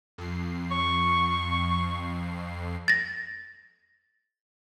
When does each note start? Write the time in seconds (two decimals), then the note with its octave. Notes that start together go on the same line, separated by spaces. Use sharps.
0.18 F2 C7
0.71 C#6
2.88 A6 A#6